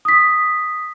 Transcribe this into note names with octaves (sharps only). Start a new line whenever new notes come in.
D#6 B6